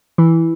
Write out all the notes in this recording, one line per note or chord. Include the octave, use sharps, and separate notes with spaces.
E3